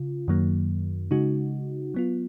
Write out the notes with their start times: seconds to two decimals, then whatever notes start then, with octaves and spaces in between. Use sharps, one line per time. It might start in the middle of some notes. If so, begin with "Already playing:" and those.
Already playing: C#3 F4
0.28 F#2 D#3 F#3 A#3
1.11 C#3 G#3 D#4 F#4
1.94 F#3 B3 F4